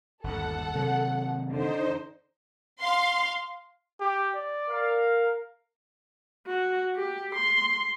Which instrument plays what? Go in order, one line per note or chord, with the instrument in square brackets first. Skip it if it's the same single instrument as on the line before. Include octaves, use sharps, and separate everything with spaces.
[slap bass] G1 D#2 [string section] A4 F#5
[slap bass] C3 D#3 F#3
[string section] D3 [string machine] D#4 C5
[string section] F5 C6
[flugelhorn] G4
D5
[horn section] A#4 F5
[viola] F#4
G4
C6